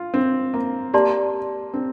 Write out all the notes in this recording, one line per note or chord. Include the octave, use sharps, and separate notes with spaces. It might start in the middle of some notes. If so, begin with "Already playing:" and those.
Already playing: F4
C4
A#3
A#3 G4 D5 A5 C6
C4